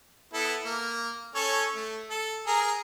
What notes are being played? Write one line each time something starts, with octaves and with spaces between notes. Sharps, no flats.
B3 E4 A4
A#3
C#4 A4 C#5
A3
A4
G#4 A#4 A#5